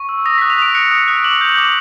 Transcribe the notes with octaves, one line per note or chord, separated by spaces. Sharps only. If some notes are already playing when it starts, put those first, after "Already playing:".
Already playing: C#6
E6
D#6 A#6
B6
F#6
F7
D#6 D7
F#6 C#7
D#6
F#6
D6 F#7
G6
F#7
D6